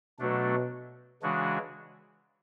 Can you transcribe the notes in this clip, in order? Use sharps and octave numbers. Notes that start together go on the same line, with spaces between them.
B2 F#3 A3 D4
C#3 E3 G#3 D4 F#4